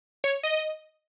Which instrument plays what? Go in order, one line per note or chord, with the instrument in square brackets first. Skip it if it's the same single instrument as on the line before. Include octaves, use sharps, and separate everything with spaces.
[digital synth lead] C#5
D#5